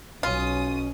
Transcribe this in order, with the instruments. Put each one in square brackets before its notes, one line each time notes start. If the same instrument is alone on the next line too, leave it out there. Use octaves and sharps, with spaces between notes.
[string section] B1 D#6 [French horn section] B2 C#4 [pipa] F4